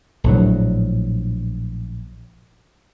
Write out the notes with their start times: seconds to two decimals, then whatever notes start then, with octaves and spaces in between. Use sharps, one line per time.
0.24 A#1 A2 F#3